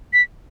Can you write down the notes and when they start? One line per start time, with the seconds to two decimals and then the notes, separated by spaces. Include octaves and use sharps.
0.13 B6